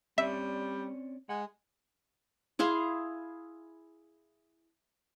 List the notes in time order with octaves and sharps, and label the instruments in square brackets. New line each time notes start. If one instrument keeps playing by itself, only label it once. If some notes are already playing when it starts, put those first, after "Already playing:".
[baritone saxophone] G3 [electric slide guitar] C4 C#4 D5 [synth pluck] E5
[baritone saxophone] G#3 [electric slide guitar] F#5
[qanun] E4 G#4 F5 C6